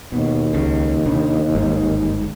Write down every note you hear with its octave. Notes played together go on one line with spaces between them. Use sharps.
D#2 B2
C#2 C#3
C3 D4
G1 G#2